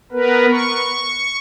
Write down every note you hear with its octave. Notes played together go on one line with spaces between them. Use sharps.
B3 A#4 B4
C#6